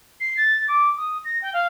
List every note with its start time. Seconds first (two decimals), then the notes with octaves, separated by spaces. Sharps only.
0.20 C7
0.37 A6
0.68 D6
0.97 D#6
1.24 A#6
1.41 G5
1.53 F5